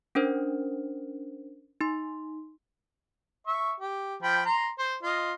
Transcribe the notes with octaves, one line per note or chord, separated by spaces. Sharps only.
C#4 D4 A#4 C5
D#4 C6
E5 C#6
G4
F3 G5 B5
A#5 C6
C5
F4 D#5